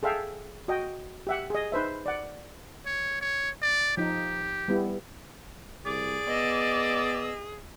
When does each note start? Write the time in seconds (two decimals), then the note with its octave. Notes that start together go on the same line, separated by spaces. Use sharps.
0.03 G#4 A4 E5 F5 G5
0.68 F#4 D#5 G5
1.27 G4 E5 F#5
1.50 G#4 D#5
1.72 D#4 B4 C5 E5
2.06 D5 F#5
2.86 C#5
3.21 C#5
3.62 D5
3.97 F3 D#4 G4
4.68 G3 B3 E4
5.86 C2 G#4 D5
6.28 B3 D#5 E6